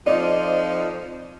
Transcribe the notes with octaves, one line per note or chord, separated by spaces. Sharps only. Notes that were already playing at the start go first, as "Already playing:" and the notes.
F2 F3 D#4 D5 D#5